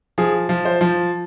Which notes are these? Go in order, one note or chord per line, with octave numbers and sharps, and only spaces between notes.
F3 G#4
F3
C5
F3